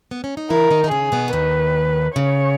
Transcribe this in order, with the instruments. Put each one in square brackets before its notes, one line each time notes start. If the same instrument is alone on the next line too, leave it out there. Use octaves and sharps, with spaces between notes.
[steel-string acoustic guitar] B3
C#4
D#4
[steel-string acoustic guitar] E3 E4 [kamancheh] A#4
[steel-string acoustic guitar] D#3 D#4
D#4
[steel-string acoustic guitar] C#3 C#4 [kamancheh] G#4
[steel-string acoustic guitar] B2 B3
E3
[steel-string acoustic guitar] D#2 D#3 [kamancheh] B4
[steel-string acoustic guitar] C#3 [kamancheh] C#5